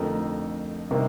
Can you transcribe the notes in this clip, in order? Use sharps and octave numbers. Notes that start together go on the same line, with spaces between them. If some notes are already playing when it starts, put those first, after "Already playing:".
Already playing: F2 D3 A3 D#4 A#4
C3 G3 A#3 D#4